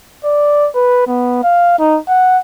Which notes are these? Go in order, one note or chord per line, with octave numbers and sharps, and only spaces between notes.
D5
B4
B3
F5
D#4
F#5